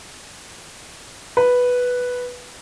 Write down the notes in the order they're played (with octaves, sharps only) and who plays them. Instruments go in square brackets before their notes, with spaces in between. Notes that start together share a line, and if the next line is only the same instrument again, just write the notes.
[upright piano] B4